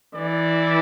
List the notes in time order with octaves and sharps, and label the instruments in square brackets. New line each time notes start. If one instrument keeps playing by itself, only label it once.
[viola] E3 [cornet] D5